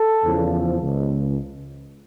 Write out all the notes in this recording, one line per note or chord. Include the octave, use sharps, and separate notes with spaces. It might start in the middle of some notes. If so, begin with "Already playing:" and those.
Already playing: A4
E2 C#3 F3
C#2